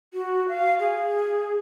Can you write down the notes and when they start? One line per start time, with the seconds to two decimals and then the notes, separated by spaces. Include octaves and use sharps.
0.14 F#4
0.49 F5
0.80 G#4